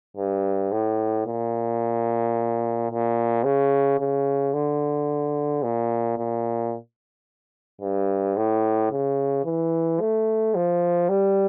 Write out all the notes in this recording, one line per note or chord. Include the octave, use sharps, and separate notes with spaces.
G2
A2
A#2
A#2
C#3
C#3
D3
A#2
A#2
G2
A2
C#3
E3
A3
F3
G3